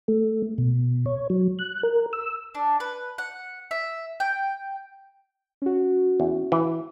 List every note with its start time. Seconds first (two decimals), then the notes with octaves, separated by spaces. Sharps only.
0.08 A3
0.58 B2
1.06 C#5
1.30 F#3
1.59 F#6
1.83 A#4
2.13 E6
2.55 D4
2.80 B4
3.18 F#5
3.71 E5
4.20 G5
5.62 C#4 F#4
6.20 E2
6.52 E3